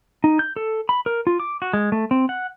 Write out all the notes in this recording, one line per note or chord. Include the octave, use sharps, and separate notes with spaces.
D#4
G6
A4
B5
A#4
F4
D6
F#4
G#3
A3
C4
F#5